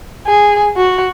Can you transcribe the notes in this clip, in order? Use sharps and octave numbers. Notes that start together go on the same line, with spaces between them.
G#4
F#4